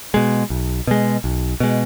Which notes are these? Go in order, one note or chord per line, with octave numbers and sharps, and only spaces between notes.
B2 G#3
B1
B2 G#3
B1
B2 G#3